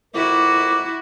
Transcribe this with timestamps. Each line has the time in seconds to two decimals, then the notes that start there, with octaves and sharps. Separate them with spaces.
0.14 F2 E4 F#4 A#4 D6